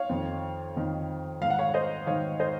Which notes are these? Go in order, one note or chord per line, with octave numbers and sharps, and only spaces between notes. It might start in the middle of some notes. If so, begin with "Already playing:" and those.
Already playing: C#5 F5
F2 D#3
F2 D#3
G#2 D#3 F5
F#5
C#5 F5
C#5
C5 D#5
G#2 D#3 C#5 F5
C5 D#5